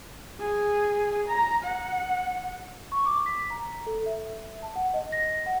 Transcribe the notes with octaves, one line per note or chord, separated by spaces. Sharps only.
G#4
A#5
F#5
C#6
D6
B6
A#5
A4
E5
A5
F#5
D#5
A#6
F#5